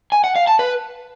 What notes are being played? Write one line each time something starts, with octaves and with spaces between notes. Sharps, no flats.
G#5
F#5
F5
A5
B4